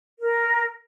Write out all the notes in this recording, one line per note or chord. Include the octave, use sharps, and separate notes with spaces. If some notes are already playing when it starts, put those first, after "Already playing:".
A#4